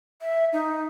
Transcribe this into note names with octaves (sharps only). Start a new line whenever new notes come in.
E5
D#4